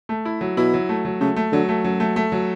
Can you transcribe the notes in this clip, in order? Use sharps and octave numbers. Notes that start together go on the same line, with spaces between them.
A3
E4
F#3
B2 E4
F#3
A3
F#3
C#3 A3
A3
D3 F#3
A3
F#2 F#3
A3
A3
F#3